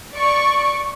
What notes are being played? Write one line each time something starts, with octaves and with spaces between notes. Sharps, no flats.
D5 C#6